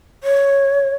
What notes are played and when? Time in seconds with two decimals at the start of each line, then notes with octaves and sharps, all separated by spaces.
0.24 C#5